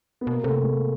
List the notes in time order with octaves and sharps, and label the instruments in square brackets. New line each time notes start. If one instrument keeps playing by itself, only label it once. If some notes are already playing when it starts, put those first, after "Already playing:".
[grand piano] B3
[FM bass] B2 [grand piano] A#3
[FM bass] C3 [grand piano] A3
[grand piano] G#3